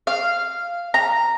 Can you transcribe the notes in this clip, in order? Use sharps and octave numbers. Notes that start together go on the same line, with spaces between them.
F5
A#5